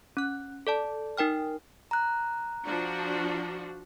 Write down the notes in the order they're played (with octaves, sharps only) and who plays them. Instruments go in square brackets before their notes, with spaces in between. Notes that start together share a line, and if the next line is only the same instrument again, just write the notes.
[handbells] C#4 F#6
A4 D5 A5
D#4 A#4 G5 F6
[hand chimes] A#5 F#6
[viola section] F3 D4 F#4